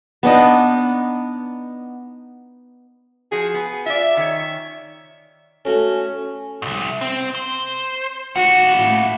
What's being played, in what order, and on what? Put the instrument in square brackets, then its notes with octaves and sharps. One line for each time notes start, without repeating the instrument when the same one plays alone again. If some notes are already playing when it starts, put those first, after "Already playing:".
[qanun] B3 D4 D#4
[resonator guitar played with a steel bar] F3 F#4 [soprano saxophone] G#4
[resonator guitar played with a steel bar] B3
[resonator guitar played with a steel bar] F4 D5 [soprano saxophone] E5
[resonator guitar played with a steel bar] D#3 C#5
[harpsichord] A3 F#4 A4 [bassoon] C#4
[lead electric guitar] C2 G#2
C4
C5
[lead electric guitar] A#3 F#5 [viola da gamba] F#4
[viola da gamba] A2